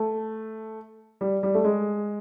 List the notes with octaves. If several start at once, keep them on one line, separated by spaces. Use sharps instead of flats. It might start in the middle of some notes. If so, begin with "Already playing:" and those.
Already playing: A3
G3
G3
A3
G#3